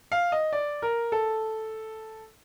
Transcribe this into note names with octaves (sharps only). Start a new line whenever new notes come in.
F5
D#5
D5
A#4
A4